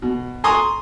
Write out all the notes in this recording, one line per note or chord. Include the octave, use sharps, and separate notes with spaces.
B2
G#5 A#5 C6 C#6 D#6